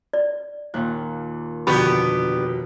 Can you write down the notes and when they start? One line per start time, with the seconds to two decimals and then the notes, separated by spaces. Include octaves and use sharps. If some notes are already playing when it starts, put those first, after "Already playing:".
0.13 D5
0.74 D#2 A#2 F#6
1.67 F2 B2 D3 B3 G4 B5 C#6